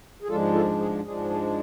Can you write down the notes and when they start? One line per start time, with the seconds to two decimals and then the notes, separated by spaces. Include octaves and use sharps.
0.22 G#4
0.28 G#2 F3 G#3 D4 F4 A4
0.53 F4 A4
0.80 G#4
1.05 G#2 F3 G#3 D4 G#4
1.30 G#4